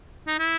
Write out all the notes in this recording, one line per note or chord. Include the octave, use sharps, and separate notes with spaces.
D#4
E4